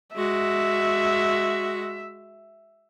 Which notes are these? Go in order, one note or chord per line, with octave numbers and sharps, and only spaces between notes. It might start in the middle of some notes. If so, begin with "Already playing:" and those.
G#3 F#4 E5